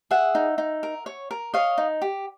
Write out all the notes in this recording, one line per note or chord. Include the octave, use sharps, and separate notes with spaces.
G#4 E5 F#5
D#4
D#4
A#4
C#5
A#4
C#5 D#5 F5
D#4
G4